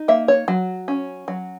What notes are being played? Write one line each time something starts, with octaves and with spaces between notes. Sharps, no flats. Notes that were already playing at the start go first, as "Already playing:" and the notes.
Already playing: D#4
A#3 E5
C#5
F#3
C#4
F#3